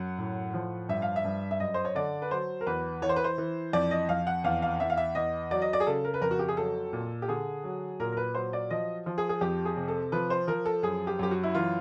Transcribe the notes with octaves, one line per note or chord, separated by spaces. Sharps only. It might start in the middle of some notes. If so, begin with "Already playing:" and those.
Already playing: F#2 F#5
A2
F3
G2 E5
F5
E5
G2
E5
F#2 D#5
C5
C#5
D3 D5
B4
F#3 C5
A#4
E2 B4
E3 C#5
C5
B4
C5
E3
F2 D5
D#5
F2 F5
F#5
E2 F5
F5
E2 E5
F5
E5
E2 D#5
F#3 D5
D#5
D5
G#4
C#3 A4
A#4
B4
F2 A#4
F#4
G4
G#4
F#3 A4
A#2
G4
D3 G#4
F#3
A#2 A#4
A#4
B4
F#3 C5
D5
F3 D#5
F3
G#4
G#4
F2 G4
G#4
C3
A4
F3 B4
C5
F3 A#4
A4
F#2 G#4
G4
F#2 G4
F#4
E4
E3 F4